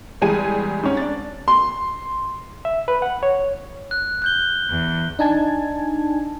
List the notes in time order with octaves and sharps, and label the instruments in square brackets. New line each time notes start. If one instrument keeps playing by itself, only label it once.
[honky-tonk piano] E2 G3 G#3 G#4 G#5 D#7
G#2 C#4
D4 A6
C6
[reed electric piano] E5
B4
F#5
C#5
[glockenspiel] F#6
F#6 G6 G7
[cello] E2
[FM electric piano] D4 D#4 G#5 A5 G#6